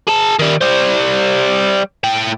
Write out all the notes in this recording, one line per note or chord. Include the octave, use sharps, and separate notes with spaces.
G#4 A5
D#3 G3
G3 C5
A2 G5